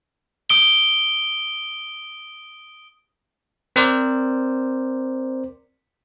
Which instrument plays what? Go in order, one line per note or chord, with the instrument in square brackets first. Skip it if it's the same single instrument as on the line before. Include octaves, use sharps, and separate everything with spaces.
[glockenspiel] D#6 D7 G7
[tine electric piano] C4 A#4 C5 D5